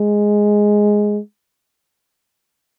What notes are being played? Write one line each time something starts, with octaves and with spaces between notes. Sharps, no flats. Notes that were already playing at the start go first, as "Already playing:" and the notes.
Already playing: G#3